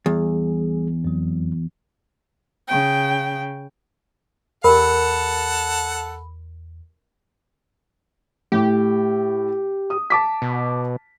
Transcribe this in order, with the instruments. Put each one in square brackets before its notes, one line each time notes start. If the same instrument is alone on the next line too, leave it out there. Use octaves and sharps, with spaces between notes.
[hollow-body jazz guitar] E2 [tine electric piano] G3 G#4
[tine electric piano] F2 F#3
[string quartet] C#3 G5
[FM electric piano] E2 [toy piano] G4 A#4 [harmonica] A4 F#5 A5 [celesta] B5
[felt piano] A2 [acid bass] G4
[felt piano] D#6
A5 D6 B6
[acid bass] B2